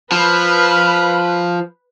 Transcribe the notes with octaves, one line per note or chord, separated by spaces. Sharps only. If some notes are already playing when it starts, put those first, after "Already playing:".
F3 B4 B5 F6